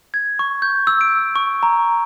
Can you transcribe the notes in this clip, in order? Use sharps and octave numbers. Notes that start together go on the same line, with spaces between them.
G#6
C#6
G6
E6
D7
C#6
A#5